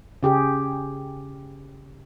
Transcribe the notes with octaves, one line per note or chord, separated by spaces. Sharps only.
C#3 G4 G#4